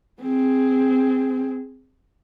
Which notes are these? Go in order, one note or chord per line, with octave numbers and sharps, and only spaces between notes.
C4 G#4